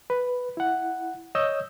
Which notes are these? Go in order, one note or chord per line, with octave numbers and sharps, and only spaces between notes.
B4
E4 F#5
C#5 D#5 D#6 E6 G6